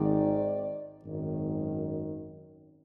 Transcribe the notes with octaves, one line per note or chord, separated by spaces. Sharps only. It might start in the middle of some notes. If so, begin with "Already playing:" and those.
Already playing: G#1 G#2 D#3 D5
G#1 F#2 D#3